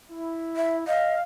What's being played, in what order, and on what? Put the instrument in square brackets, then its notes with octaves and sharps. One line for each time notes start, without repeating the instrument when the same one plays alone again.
[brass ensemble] E4
[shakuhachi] E5
[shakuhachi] D#5 [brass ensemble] F5